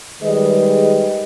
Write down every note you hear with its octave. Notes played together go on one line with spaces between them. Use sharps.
D#3 G3 G#3 G#4 B4 D#5